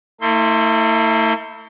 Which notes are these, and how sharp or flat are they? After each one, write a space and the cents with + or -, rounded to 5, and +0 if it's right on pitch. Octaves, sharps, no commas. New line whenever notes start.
A3 +40 E4 -25 C6 +0